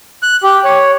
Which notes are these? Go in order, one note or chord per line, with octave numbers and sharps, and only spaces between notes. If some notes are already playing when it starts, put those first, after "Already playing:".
F#6
G4
C#5